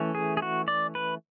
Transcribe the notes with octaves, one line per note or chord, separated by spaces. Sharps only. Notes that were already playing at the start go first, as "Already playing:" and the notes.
Already playing: E3 A3 C#4
G#4
G#4
F#4
D5
B4